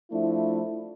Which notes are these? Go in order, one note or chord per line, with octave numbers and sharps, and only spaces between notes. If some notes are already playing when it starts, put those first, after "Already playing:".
F3 A3 D4 E4